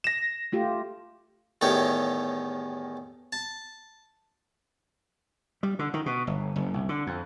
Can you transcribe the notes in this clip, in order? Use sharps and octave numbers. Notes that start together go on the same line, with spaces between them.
A#6 E7
A3 F4 G4
E2 A2 D#3 G4 C#5
A5
G3
D3
D#3
B2
G1
F#1
C2
D3
F2